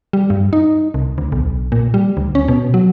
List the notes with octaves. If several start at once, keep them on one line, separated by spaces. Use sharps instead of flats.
G3
G2
D#4
C2
D2
B1
A#2
G3
D2
C#4
B2
F#3